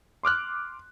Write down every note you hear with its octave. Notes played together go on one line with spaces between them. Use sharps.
C6 D6 F6 F#6